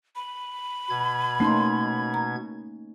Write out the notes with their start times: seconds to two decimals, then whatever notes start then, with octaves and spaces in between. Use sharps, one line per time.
0.16 B5
0.90 B2 G#6
1.40 A3 A#3 C#4 D#4 C6
2.14 A#5